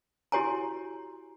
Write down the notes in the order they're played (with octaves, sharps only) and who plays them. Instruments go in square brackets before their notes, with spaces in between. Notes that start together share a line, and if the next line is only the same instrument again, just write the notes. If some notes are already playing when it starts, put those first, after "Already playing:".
[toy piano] E4 F#4 G4 C#5 G#5 A#5